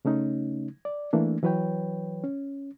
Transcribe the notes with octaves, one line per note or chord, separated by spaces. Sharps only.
C#3 A3 C#4 D#4
D5
E3 A3 A#3 D4
E3 F#3 B4 C#5 G5
C#4